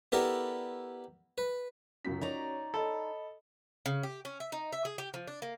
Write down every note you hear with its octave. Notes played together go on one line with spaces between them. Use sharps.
B3 E4 G4 A4 A#4 D5
B4
C#2 F#2 C#4 F#4 B6
D#4 C#5 D5 A#5
A4 D#5 B5
C#3
G4
C#4
E5
D#4
E5
G#4
G4
F3
D4
A#3